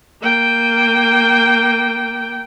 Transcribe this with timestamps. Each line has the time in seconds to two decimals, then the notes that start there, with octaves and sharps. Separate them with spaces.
0.21 A#3 G5